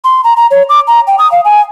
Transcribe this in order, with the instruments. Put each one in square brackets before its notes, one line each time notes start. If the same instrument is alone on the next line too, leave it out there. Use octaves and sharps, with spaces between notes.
[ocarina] C6
A#5
A#5
C#5
D6
A#5
G5
D#6
F5
G#5